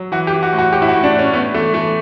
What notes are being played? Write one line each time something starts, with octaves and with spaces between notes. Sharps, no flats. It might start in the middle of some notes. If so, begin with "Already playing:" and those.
Already playing: F#3
E3 F#4
G4
E3
F#4
A2
F#4
A2 G4
E4
F#4
A2
D4
A2
C#4
A2 B3
E3 A3
E3 A3